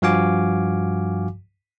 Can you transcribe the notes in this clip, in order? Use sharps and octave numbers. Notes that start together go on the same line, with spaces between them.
G2 F3 F#4 F5 G#5 D6